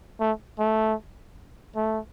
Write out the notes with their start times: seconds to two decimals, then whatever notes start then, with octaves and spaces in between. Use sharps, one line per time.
0.20 A3
0.59 A3
1.76 A3